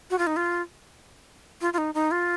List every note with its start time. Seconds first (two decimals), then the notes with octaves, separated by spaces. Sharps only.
0.10 F#4
0.18 F4
0.27 D#4
0.36 F4
1.61 F4
1.73 F4
1.78 D#4
1.94 D#4
2.11 F4